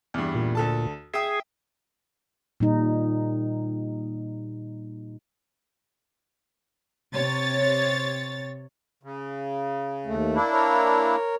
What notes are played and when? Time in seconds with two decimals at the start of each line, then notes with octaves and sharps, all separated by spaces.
0.14 E2 G2
0.35 A#2
0.55 D2 A4 A5
1.14 G#4 E5 G5 D#6
2.60 A#2 G3 D#4
7.14 C3 C#5 A6
9.03 C#3
10.06 D#2 A3
10.35 A#3 D4 E4
10.53 A#4 C#5